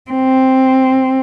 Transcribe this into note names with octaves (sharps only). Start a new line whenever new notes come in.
C4